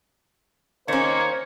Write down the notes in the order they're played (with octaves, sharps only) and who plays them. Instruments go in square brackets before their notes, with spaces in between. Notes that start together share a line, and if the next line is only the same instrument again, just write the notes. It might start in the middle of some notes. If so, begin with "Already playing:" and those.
[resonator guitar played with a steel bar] D#3 C#4 [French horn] A#3 [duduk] C5 [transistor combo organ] C#5